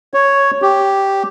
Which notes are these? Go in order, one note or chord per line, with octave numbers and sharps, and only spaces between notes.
C#5
G4